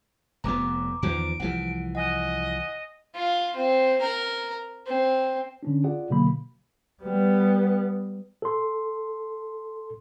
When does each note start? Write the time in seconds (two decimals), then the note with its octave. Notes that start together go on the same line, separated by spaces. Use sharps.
0.44 F1 F2 B3 A#5 D6
1.03 E2 D#3 F3 D7
1.40 C2 E3 F3 F#5
1.95 D#5 F#5 G#5 F#6
3.15 F4
3.56 C4
4.01 A#4
4.87 C4
5.63 D3 C#4 D4
5.84 F4 G#4 D5 F#5
6.10 B2 D3 F#3 A#3 B5
7.02 G3 B3
8.42 A4 C6